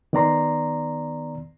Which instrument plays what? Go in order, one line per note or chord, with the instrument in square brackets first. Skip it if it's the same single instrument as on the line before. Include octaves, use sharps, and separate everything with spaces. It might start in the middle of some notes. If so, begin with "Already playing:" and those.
[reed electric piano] D#3 B3 D5 A#5 C6